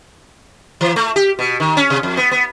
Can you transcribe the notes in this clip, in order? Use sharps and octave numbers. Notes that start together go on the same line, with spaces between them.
E3
A3
G4
B2
D#3
C#4
C3
F2
B3
B3